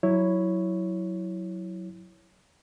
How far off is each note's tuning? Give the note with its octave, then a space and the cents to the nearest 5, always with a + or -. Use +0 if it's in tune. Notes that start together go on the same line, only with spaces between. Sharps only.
F#3 +0 E4 +0 C#5 +0